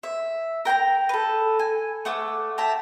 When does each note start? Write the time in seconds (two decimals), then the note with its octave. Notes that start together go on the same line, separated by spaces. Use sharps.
0.03 E5
0.65 A#4 G5 G#5 A#5
1.09 A4 B4
1.59 G#5
2.05 A3 F#5 D6 E6
2.58 E5 G5 A5 A#5